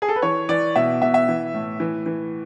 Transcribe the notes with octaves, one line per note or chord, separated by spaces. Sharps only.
G#4
A4
B4
E3 C#5
E3 D5
B2 E5
B2 E5
E5
E3
A2
E3
E3